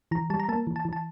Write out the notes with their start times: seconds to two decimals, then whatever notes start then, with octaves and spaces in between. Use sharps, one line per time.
0.11 E3 A#5
0.30 G3 A5
0.40 A#5
0.49 A#3 A5
0.67 E3
0.76 A5
0.85 E3
0.93 A5